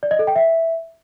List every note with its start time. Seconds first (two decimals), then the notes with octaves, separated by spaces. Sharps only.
0.03 D5
0.11 D#5
0.19 A4
0.27 G5
0.36 E5